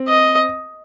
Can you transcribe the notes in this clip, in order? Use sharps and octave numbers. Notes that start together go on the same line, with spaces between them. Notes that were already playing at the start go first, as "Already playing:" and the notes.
Already playing: C4
D#5